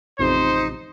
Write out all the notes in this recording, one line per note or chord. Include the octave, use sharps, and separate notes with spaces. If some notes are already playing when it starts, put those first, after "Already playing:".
A1 F2 C3 D#4 C5